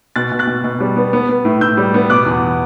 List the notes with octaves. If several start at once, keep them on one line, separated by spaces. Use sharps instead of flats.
B2 F#6 A6
B2
F#6 A6
B2
B2
G3
B3
B3
B3
A2
A2 E6 G6
G3
B3
B2 D6 F#6
E2